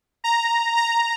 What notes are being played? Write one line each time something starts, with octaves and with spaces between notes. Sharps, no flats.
A#5
A#5